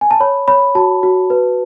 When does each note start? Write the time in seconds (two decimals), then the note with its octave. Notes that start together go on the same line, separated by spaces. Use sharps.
0.01 G#5
0.11 A5
0.20 C#5 B5
0.48 C#5 B5
0.75 F#4 A5
1.03 F#4
1.30 B4